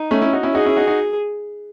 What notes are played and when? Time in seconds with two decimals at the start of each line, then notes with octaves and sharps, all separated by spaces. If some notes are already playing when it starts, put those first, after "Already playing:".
Already playing: D#4
0.11 A3 C#4
0.21 C#4 E4
0.33 D#4 F#4
0.43 C#4 E4
0.54 D#4 F#4 G#4
0.65 C#4 E4
0.77 D#4 F#4
0.87 D#4 F#4